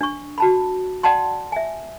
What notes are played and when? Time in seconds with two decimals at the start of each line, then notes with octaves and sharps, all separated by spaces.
0.01 D4 C#6
0.38 F#4 A5 B5
1.03 D5 F#5 G5 A5 C6
1.52 E5 G#5